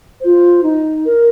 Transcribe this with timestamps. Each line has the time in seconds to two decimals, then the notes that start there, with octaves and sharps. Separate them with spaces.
0.21 F4 C5
0.63 D#4
1.05 A#4